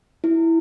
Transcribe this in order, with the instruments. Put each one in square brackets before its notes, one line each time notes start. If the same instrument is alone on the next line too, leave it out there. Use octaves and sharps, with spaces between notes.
[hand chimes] E4